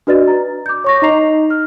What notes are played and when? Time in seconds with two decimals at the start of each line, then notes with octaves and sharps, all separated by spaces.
0.07 D4 F#4 B4 D5 D#5 A6
0.27 A#5
0.66 D6 G6
0.84 C#5 C#6 A#6
1.02 D#4 D#5 A#5 C7 F7
1.50 F6